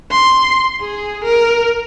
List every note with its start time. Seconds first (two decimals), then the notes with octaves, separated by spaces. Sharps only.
0.11 C6
0.81 G#4
1.24 A#4